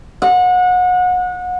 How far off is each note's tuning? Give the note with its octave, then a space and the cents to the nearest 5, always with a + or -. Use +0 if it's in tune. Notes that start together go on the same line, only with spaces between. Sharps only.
F#5 -30